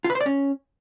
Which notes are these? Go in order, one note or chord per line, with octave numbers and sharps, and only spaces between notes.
F4
B4
C5
D5
C#4